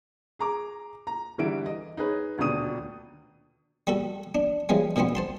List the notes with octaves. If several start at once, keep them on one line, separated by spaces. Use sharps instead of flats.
G#4 A#5 D6
A#5
G1 D3 E3 G3 E5 D7
D#5
D#4 G#4 B4 C#5
D#1 D2 B2 D4 D#6 D#7
G3 F#4 A4
D4
C#3 E3 F3 G3 G#3
B2 D3 F3 B3 C4
C5 A5 C6